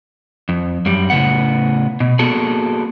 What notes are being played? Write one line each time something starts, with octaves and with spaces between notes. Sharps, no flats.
F2
F#2 G3
A2 C#3 G#3 B3 F#5
B2
A#3 B3 F#4 G#4 A4